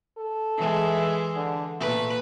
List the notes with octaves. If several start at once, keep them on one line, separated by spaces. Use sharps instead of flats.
A4
E3 G#3
D3
A#2 A3 B4